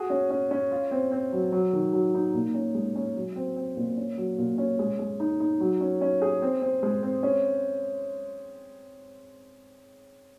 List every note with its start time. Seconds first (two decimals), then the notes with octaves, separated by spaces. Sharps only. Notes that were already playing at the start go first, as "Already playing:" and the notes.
Already playing: F#4 G#4
0.10 C#4
0.30 C#4
0.51 C#4
0.72 F4
0.91 C4
1.12 C4
1.33 F#3
1.52 F#3
1.73 D#3
1.93 F#3
2.14 D#4
2.34 A#2
2.54 C#4
2.75 G#3
2.96 C#4
3.16 F#3
3.36 C4
3.56 C4
3.77 A#2
3.97 C#4
4.17 F#3
4.38 A#2
4.58 C#4
4.79 G#3
4.99 G#3
5.20 D#4
5.40 D#4
5.60 F#3
5.81 C#4
6.01 C#4
6.22 G#4
6.42 C4
6.62 C4
6.83 G#3
7.03 C4
7.23 C#4